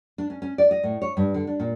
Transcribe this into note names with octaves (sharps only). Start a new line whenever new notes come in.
D4
C#4
C#4
D5
D#5
A2
C#5
G2
D3
D4
A#2